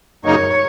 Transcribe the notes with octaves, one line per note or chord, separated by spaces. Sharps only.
F#2 C#3 F#3 A#3 D#4 C#5